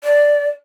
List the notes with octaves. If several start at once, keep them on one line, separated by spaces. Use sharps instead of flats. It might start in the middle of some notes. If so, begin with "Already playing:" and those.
D5